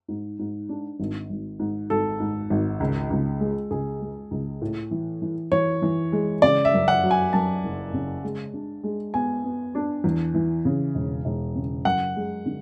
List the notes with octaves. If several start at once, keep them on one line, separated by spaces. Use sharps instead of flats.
G#2
G#2
D4
G#1
G#1
G#2
G#1 A4
G#2
G#1
C#2
C#2
G#3
C#2 G#4
G#3
C#2
A2
E3
E3
E3 C#5
E3
G#3
C#3 D5
E5
F#2
F#5
F#3
G#5
F#2 A5
F#1
C#3
G#3
D4
G#3
B3 G#5
B3
D4
E2
E3
C#3
E1
E1
C#3
F#2 F#5
G#3
D3